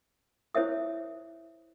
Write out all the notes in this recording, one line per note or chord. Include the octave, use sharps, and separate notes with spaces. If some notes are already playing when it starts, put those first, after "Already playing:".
E4 C5 C#5 E5 D#6